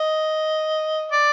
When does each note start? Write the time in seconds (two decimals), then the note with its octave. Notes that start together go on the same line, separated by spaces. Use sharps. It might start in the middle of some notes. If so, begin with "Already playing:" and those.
Already playing: D#5
1.12 D5